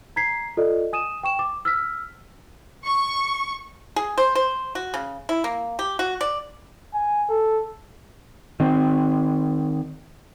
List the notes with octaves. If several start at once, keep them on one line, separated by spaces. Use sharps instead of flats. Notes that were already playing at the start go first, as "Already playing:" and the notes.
A#5 G#6 B6 C7
F4 A4 D5 D#5
G#5 D#6 D#7 E7
G5 C#6 E7
D6
E6 F6 B6
C#6
G#4
C5
C5
F#4
C#3
E4
A#3
G4
F#4
D5
G#5
A4
D#3 C4